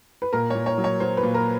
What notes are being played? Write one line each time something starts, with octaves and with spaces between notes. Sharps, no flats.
B4
A#2 A#4
A#2 C#5
C#5
F#3
C#5
F#3 C5
B4
A#2
A#4